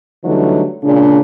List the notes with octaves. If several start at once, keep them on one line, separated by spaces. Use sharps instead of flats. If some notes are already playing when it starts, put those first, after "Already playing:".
D3 E3 F#3 G3 A3 D#4
A#2 C#3 G#3 D4